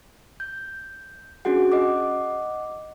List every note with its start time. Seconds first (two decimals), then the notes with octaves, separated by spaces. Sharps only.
0.40 G6
1.45 C#4 D4 F#4 G#4 F#5
1.72 D#5 F#5 D6